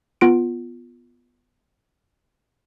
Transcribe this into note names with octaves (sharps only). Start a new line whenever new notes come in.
B3 F4 D7